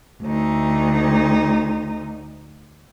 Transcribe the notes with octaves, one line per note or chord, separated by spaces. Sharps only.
D2 D#4